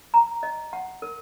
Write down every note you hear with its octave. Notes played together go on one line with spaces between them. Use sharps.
A#5
D#5
F#5
A#4